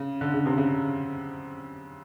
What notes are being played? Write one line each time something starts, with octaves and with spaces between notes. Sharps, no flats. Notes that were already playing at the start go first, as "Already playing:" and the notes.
Already playing: C#3
D3
C#3
C3
C#3